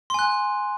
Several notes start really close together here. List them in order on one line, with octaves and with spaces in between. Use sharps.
C6 G#5 F#6